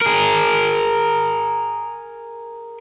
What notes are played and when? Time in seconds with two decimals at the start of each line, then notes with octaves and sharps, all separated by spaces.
0.01 G#4 A#4